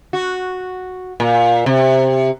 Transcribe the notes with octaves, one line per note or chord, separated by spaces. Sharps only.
F#4
A#2
C3